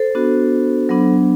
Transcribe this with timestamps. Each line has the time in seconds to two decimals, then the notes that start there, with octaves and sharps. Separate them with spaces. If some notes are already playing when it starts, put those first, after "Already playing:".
Already playing: A4 C5
0.15 B3 D4 F#4
0.89 F#3 B3 D4